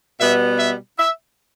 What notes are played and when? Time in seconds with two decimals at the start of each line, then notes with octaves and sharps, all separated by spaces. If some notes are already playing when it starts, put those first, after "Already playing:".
0.20 B2 G3 B3 E5
0.59 E5
0.99 E5